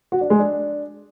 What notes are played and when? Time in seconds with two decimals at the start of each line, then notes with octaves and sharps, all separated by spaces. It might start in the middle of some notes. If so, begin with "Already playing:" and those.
0.12 F#4
0.21 D4
0.30 G#3
0.39 D4